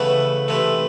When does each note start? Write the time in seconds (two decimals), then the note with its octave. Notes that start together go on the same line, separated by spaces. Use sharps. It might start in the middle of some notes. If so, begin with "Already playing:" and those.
Already playing: C#3 E3 A3 B3
0.48 C3 E3 A3